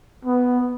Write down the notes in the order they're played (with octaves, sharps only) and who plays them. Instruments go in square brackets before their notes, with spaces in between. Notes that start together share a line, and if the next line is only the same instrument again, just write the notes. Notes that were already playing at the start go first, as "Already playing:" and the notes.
[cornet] B3